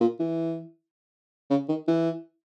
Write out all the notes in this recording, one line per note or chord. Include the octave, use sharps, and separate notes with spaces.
A#2
E3
C#3
D#3
E3